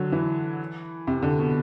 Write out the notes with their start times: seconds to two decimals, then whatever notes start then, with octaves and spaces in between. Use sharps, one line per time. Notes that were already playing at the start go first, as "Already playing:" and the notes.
Already playing: D3 F#3
0.12 E3
1.07 C3
1.22 D3
1.39 B2